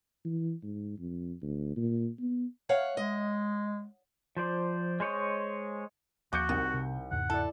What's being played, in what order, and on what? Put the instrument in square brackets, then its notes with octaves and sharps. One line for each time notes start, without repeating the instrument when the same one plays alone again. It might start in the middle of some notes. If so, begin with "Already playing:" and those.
[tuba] E3
G#2
F2
D2
A#2
B3
[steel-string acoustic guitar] C#5 F5 F#5
[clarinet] G#3 [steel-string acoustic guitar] D#5
[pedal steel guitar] F3 C5 D5
G#3 C5 C#5 D#5
[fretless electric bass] D#2 F3 A#3 [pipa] C#3 [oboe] F#4 [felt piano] D6 G6 C#7
[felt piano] C2 [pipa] D#3
[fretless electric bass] C3
[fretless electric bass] E2 G#2 C#3 [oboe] F#5
[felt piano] E4 D5 [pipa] A4